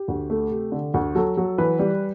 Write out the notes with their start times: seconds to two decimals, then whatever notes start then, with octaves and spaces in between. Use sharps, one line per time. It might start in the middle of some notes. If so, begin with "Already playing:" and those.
Already playing: G4
0.08 D2
0.30 A3
0.50 C3
0.72 D3
0.94 D2
1.15 F#3 A4
1.37 F#3
1.58 E3 B4
1.79 G3